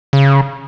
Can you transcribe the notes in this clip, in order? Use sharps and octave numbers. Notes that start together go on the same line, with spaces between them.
C#3